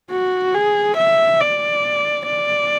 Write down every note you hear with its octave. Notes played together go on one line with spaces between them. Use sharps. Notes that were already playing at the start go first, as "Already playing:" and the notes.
F#4
G#4
E5
D5
D5